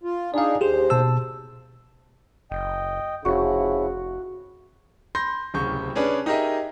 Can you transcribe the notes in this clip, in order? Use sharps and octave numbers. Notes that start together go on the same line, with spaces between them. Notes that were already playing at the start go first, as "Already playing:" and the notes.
F4
D4 D#4 G#4 D5 F5
D#2 G4 G#4 C5
B2 A5 E6
F#1 D#5 G5
F1 C#3 F3 E4 F#4
B5 C6 G6 A#6
D1 C2 C#3 C#6 G6
C#4 D4 G#4 B4 D5 A5
D#4 G4 G#4 A#4 D#5 E5